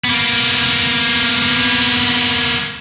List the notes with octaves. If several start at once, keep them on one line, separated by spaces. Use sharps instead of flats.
A#3 B3